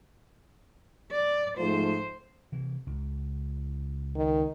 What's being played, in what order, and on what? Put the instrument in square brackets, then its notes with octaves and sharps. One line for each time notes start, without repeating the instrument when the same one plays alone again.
[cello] D5
[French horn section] G#2 F3 A3 [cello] C5
[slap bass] C3 E3
C#2
[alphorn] D#3